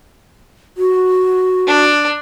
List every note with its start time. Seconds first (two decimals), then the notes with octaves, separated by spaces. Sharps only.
0.78 F#4
1.67 D4